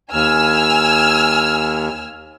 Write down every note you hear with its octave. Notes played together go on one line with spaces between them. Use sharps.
D#2 G#5 E6 F6